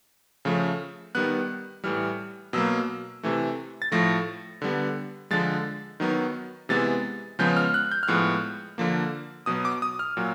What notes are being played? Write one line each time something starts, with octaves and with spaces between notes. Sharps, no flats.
C#3 F3 A3
D#3 G3 B3 F#6
A2 E3 G3 F6
B2 F#3 A#3 E6
C3 E3 A3
A6
A2 F3 A3 A#6
D3 G3 B3
D3 F3 G#3 A6
D#3 F#3 B3
C3 E3 G#3 B3 A6
C#3 F3 G#3 B3 G6
F6
F#6
G6
F6
A2 F3 G#3 B3 F#6
D3 F3 A#3
B2 F#3 B3 D#6
D6
D#6
F6
A#2 F#3